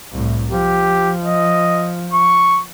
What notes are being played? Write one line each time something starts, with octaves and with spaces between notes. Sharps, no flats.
C2 A2
F3 G4
D#5
C#6